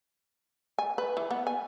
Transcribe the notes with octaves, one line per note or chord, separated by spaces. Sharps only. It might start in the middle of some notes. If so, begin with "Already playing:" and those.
G#5
B4
E3
B3
G#5